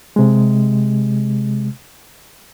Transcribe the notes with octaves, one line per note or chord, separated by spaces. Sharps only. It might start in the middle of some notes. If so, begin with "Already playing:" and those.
C3 G#3